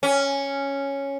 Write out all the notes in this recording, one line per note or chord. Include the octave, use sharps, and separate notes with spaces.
C#4